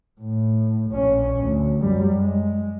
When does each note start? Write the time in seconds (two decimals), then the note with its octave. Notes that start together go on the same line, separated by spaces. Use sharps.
0.21 A2
0.91 A#1 C#4
1.39 D2
1.81 F#2 G3
2.15 G#3